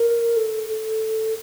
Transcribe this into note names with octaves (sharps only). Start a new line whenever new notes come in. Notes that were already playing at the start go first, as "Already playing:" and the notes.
Already playing: A#4
A4
A4